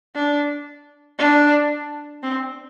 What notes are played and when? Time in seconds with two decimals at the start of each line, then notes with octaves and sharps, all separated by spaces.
0.15 D4
1.19 D4
2.23 C4